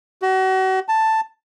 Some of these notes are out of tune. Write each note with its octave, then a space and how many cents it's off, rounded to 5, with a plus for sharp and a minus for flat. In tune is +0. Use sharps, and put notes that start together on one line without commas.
F#4 +35
A5 +5